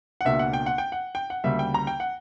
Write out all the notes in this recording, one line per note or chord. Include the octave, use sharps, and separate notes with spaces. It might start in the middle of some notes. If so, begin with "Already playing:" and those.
F#5
C#2 B2 A#3 D4 E5
F#5
G5
F#5
G5
F#5
G5
F#5
D2 C#3 G3 A#3 E5
G5
A#5
G5
F#5